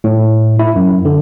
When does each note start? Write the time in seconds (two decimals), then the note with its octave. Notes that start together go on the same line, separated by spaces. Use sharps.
0.04 A2
0.59 E4
0.76 F#2
1.05 D3